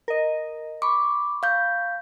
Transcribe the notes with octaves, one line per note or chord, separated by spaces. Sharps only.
A#4 D#5
B5 C#6 D6
F5 G6